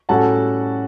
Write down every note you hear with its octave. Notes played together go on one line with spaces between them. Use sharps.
A2 G3 C#4 F#4 A4 F#5 A5